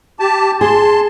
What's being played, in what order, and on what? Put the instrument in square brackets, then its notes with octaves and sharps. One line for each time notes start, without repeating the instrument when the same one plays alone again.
[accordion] G4 A5
[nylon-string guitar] G#4 [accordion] A5 C6